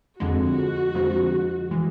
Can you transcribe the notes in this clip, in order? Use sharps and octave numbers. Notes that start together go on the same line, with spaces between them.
F2 D3 F3 G#3 F#4
F2 D3 F3 G#3
E3 G#3